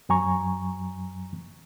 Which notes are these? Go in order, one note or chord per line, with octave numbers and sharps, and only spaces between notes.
F#2 F#3 G#5 A#5 C#6